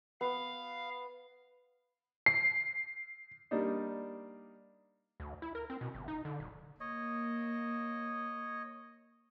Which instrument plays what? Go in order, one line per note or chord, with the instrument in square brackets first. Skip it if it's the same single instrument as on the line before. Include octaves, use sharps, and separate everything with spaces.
[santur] B3 [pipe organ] F5
[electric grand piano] C7
[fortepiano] G3 A#3 D4 D#4
[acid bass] D2
E4
A#4
C4
B2
G1
D#4
D3
D1
[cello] A#3 [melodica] C#5 D#5